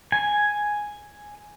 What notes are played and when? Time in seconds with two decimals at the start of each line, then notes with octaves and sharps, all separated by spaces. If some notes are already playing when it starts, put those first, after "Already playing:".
0.12 G#5